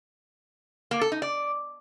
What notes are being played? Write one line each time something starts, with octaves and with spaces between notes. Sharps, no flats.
A#3
A4
D#4
D5